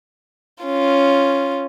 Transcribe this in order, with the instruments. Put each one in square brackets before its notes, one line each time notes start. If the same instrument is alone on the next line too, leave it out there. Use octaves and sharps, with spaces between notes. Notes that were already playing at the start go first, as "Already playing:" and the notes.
[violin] C#4 F4